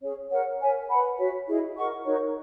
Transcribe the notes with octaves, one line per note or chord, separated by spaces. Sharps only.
C#4 G#4 C#5
A#4 C#5 F#5
A#4 C#5 E5 G#5
B4 F#5 B5
F#4 C#5 E5
E4 G#4 D#5
A#4 D#5 F#5 C#6
D#4 F#4 A#4 C#5